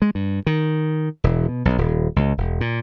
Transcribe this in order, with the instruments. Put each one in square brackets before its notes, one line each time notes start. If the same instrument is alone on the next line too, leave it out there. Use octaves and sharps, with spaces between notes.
[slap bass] G#3
G2
D#3
E1
B2
B1
D#1
C#2
E1
A#2